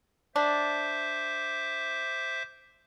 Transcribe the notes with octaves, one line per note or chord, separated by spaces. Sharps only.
D4 C5 E5 D6